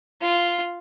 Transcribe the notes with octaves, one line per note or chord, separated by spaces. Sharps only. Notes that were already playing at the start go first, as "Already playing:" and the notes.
F4